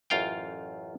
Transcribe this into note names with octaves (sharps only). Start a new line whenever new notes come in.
A1 F#2 F4 F5 G5